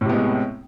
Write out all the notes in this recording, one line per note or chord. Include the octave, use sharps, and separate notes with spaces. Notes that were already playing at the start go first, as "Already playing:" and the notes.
A2 C3 G#3 B3